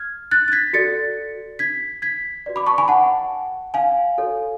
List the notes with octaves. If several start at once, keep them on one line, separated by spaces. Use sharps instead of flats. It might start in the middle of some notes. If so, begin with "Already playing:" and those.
Already playing: F6 G#6
F#6 A6
A6
G#6 B6
F#4 A4 D5 A6 C#7
G#6 B6
G#6 B6
F#4 B4 D5
B5 D6
A5 C#6
G#5 B5
F#5 A5
F5 G#5
F#4 A4 C#5